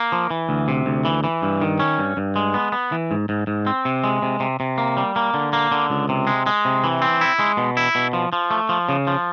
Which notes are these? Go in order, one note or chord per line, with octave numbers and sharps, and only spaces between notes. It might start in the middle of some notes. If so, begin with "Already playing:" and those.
Already playing: A#3
F3
E3
D2
C3
D2
E3
E3
G2
D#3
C#4
G2
G2
G#3
B3
B3
E3
G#2
G#2
G#2
C4
C3
G#3
C3
C3
C3
A#3
G3
A#3
D3
A#3
D3
C#2
C3
G#3
G#3
C3
E3
C4
E4
G#3
B2
E4
B2
F3
F3
A3
F3
C#3
F3